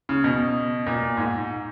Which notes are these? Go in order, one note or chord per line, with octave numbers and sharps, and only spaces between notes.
C#3
B2
A#2
G#2